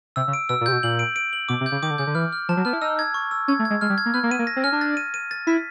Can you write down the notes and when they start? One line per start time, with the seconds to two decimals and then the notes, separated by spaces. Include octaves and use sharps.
0.16 C3 E6
0.28 C#3
0.33 D7
0.49 B2 E6
0.61 A#2
0.66 C3 G6
0.72 B2
0.83 A#2 F#7
0.99 D7
1.16 D7
1.33 F#7
1.49 B2 D6
1.61 C3
1.66 G6
1.72 C#3
1.82 D#3 D6
1.90 D3
1.98 C#3 G6
2.07 D3
2.15 E3 F6
2.32 F6
2.49 F3 A5
2.57 F#3
2.65 B3 F6
2.73 E4
2.81 D#4 E6
2.99 G#6
3.14 C#6
3.31 E6
3.48 C#4 G#6
3.59 A3
3.65 G#6
3.70 G#3
3.81 G#3 F6
3.90 G3
3.98 G#6
4.06 A#3
4.14 B3 F6
4.23 A#3
4.31 B3 D#7
4.39 A#3
4.47 A#6
4.56 C4
4.64 C#4 F6
4.72 D4
4.81 A6
4.97 D#7
5.14 D#7
5.31 A6
5.47 E4 B6